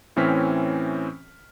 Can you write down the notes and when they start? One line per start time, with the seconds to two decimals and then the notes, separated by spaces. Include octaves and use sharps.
0.16 A2 E3 C4 C#4 F6 B6